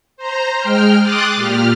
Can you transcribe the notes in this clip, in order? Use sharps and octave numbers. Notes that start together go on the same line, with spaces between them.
C5 A#5
G#3 G5 F6
C6 D6 D#6 F#6 A6
A#2 G4 F6